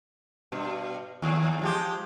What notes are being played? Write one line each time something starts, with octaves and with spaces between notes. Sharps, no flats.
G2 B2
D#2
F3 G#3 G4